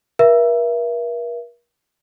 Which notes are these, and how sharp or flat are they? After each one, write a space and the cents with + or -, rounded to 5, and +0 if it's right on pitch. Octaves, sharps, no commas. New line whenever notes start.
A#4 +40 E5 +25